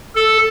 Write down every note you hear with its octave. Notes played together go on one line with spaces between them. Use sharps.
A4